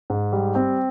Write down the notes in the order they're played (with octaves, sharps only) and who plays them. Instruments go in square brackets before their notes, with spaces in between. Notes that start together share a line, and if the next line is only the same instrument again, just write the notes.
[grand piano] G#2
G3
C4